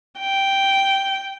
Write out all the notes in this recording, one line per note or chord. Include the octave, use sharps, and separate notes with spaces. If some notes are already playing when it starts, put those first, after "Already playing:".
G5